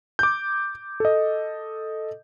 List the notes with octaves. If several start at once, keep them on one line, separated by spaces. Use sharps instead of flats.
D6 G6
A4 D#5